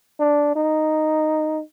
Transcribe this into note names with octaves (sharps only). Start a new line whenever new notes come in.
D4
D#4